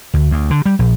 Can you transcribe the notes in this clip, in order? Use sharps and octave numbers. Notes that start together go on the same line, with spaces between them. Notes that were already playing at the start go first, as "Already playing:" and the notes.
D2
D2
D3
G3
A#1